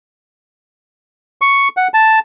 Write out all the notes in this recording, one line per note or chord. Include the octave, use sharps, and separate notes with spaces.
C#6
F#5
A5